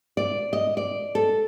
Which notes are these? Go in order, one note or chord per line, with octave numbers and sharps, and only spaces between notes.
D5
D#5
D5
A4